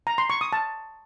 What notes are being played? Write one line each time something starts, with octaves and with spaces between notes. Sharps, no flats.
A#5
C6
C#6
D#6
A5